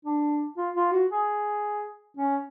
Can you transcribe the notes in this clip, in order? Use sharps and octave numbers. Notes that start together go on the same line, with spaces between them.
D4
F4
F4
F#4
G#4
C#4